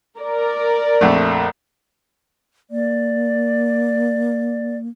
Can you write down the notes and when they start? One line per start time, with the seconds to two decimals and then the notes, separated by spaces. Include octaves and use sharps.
0.18 A#4 D5
1.01 A#1 F2 A3
2.71 A#3 D5